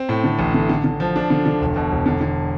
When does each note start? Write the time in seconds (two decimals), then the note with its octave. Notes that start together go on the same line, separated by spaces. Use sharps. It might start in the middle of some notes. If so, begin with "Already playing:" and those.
Already playing: C4
0.09 A2
0.24 D3
0.39 A1
0.54 D3
0.69 D3
0.84 D3
1.00 F3
1.16 D4
1.30 D3
1.46 D3
1.61 E1
1.76 B2
1.92 E1
2.06 D3
2.21 D3